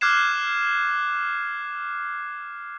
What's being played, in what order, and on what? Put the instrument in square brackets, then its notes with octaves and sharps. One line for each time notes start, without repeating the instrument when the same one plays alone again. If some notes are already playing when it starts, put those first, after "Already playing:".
[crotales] D6 F6 F#6 G#6 C7 E7